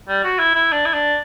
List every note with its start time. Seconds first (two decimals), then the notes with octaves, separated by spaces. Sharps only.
0.08 G3
0.24 F#4
0.39 E4
0.55 E4
0.72 D4
0.86 E4
0.93 D4